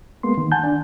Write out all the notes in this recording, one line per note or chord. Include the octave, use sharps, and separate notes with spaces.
G#3 A#3 B3 C6
D#3
F#5 G#5 A5 G6
D4